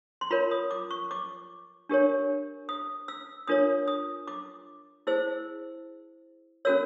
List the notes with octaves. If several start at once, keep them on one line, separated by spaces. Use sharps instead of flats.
C6
F4 A#4 C#5 B5
D#6
D6
C#6
D6
D4 G4 A#4 C#5
D#6
E6
D4 F4 A#4 C#5 D#6
D#6
D6
E4 G#4 C5 E6
C#4 F#4 A#4 C#5 E6